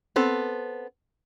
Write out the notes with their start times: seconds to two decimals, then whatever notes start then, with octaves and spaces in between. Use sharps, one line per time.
0.16 B3 C4 A4